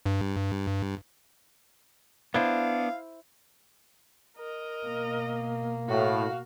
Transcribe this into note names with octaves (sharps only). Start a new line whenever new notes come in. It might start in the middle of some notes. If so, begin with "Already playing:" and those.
G2
B3 D4 E4 C5 F5
A#4 D#5
B2 A#3
A2 F#4 F5